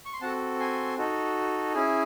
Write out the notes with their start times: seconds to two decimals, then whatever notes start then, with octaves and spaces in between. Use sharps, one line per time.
0.06 C#6
0.13 C6
0.21 C4 F#4 A4 F#5 A5
0.59 G#5 C6
0.97 D#4 F#4 A4
1.74 C#4 E4 G#4